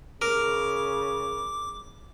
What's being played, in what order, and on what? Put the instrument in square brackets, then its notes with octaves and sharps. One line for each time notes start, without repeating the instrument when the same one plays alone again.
[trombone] C#3 [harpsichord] A#4 [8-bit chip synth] D6